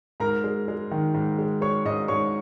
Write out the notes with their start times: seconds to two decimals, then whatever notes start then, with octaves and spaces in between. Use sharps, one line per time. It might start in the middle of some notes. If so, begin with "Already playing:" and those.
0.20 G#2 A#4 A#5
0.44 G#3
0.68 G#3
0.91 D#3
1.14 G#2
1.39 G#3
1.61 G#3 C#5 C#6
1.85 G#2 D#5 D#6
2.08 G#2 C#5 C#6